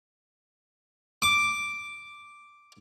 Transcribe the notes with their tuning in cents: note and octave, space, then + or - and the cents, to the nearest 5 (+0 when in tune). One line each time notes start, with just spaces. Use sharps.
D6 +0